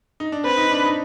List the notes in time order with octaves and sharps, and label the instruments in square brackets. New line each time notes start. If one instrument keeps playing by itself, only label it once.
[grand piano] D#4
D4
[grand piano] C4 [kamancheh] B4
[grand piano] D#4
D4
D#4